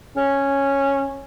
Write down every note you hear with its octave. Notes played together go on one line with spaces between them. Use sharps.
C#4